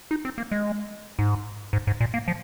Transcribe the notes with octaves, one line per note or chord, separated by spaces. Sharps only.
D#4
C4
A#3
G#3
G#2
G#2
G#2
A#2
A#3
F3